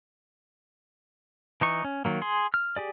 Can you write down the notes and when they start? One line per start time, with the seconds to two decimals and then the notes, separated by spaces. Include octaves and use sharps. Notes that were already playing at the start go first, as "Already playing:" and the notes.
1.61 E3 D#4 C#6
1.84 C#4
2.05 D#3 F#3 A#3
2.22 G#4 C6
2.54 F6
2.76 G4 G#4 D5